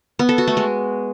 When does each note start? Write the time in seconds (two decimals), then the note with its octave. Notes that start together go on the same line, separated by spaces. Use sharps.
0.19 B3
0.29 A4
0.38 F#4
0.47 A3
0.57 G#3